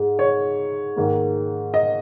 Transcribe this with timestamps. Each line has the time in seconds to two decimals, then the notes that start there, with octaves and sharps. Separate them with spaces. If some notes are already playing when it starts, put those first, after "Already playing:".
Already playing: G#2 G#3
0.19 C#5
0.96 G#2 D#3 A#3
1.74 D#5